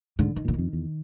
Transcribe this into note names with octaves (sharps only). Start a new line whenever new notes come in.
G#2 D3
D#3
A#2 D3
F2 D#3
E2